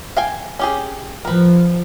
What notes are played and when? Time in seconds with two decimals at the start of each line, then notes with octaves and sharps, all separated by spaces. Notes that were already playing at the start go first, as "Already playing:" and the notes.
0.17 F5 G5 G#5
0.59 C#4 G4 G#4
1.25 F3 A#4 B4